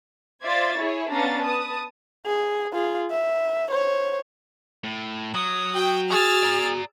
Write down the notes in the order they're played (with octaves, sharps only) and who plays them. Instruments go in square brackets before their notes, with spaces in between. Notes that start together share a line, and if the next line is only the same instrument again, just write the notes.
[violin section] F4 C5 D5 E5 G#6 A6
E4 G#4 C#5
B3 C#4 D4 F5 A#5 A6
B4 A5 D#6
[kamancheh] G#4
F4 G#4
E5
C5 C#5
[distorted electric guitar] A2
[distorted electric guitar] F#3 [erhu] D#6
[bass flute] F#4 [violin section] G5
[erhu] G#4 [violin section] E6 F6 A6
[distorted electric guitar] D5 A#5